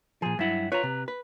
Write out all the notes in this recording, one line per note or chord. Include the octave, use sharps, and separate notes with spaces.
A#2 F3 G#4
G2 F#3 E4 E5 F#5
F4 B4 C#5 A#5
C3
B4